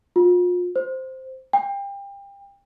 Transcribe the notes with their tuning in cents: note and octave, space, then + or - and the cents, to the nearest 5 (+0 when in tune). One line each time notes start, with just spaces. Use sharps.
F4 +35
C5 +0
G5 +30